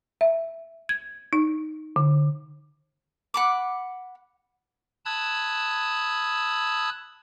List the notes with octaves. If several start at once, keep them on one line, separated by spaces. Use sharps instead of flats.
E5
G#6
D#4
D3
F#5 B5 D6
A5 B5 D#6 E6 F#6 G#6